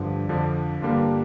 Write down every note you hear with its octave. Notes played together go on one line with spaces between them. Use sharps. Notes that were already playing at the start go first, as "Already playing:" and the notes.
Already playing: G2 D3 F3 D4
F2 D3 F3 D4
G2 D3 G3 A#3 D4 F4